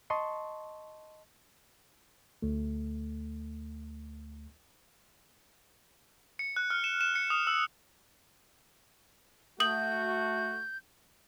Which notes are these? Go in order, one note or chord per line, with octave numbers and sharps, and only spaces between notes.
D#5 A5 C6 C#6
D2 A3
C#7
F#6
F6
E7
E7
C#7
D#6
E6
A3 F#4 D#6 G6 F#7